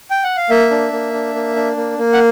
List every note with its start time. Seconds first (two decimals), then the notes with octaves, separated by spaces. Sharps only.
0.11 G5
0.24 F#5
0.37 F5
0.50 A#3 E5
0.71 D4
0.92 A#3
1.14 D4
1.35 A#3
1.56 D4
1.77 A#3
1.98 A#3
2.13 F#5